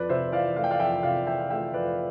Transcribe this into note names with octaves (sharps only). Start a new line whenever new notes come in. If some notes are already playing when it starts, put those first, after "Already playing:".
Already playing: F2 B4 D5
C3 C5 E5
E3 D5 F5
A3 F5
G5
D5 F5
F2 E5 G5
C3 D5 F5
E3 E5 G5
A3 E5 G5
F2 B4 D5